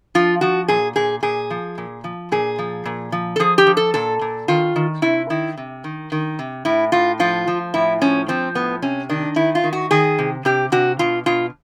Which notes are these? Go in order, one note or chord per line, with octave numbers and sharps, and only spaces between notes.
F3 F4
F3 F#4
A#2 G#4
A#2 G#4
A#2 G#4
F3
A#2
F3
A#2 G#4
F3
A#2
F3
A4
F3 G#4
G4
F3
A4
A#2 A4
A#2
D#3 F4
D#3
C3 E4
D#3 E4
C3
D#3
D#3
C3
A2 E4
A2 F4
F3 F4
F3
A2 E4
F3 C#4
F3 C4
A2 B3
C3 C#4
D#3 D4
D#3 E4
F4
D#3
F#4
D#3 G#4
C3
C3 G4
C3 F#4
B2 F4
B2 F4